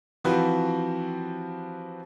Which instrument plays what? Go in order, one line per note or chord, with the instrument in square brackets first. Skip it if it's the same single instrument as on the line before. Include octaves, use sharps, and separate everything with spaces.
[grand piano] E3 F3 C4 F#4 G4 B4